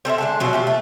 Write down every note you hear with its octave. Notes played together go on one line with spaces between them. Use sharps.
C4 A4 C#5 E5
D3 G#3 A5
B2 F#3 F4
F4 G4 E5
A3 E5